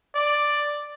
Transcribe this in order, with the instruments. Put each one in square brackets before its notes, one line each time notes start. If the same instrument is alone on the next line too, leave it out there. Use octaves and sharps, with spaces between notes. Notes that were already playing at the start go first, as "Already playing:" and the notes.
[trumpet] D5